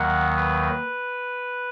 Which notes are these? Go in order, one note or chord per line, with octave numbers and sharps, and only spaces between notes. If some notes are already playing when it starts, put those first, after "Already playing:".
Already playing: D#2 D#3 F#3 F#5
B4